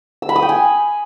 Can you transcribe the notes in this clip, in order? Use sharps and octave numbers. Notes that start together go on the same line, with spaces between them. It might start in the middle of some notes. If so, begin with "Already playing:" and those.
E6
B5
D#6
G5
G#5